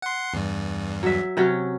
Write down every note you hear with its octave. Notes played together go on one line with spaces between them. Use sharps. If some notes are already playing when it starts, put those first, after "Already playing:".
F#5 C6
E2 G2
F#3 E5
C3 F#3 C#4